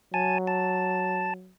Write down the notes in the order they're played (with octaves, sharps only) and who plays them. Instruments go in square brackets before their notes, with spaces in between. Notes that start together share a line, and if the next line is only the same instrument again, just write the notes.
[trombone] F#3 [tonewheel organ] G#5 A5
[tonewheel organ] A5